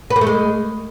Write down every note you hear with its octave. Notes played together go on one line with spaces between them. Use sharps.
B4
A#3
A3
G#3